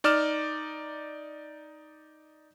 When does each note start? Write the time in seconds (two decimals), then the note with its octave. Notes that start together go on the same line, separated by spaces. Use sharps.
0.04 D#4 D5 D6 F6 E7